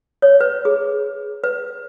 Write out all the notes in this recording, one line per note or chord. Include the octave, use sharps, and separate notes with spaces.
C#5
B4
G#4
B4